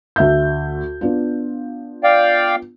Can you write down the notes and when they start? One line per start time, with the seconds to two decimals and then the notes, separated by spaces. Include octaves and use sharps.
0.16 D2 E5 G6
1.01 B3 D4 F4
2.04 D5 F5 G5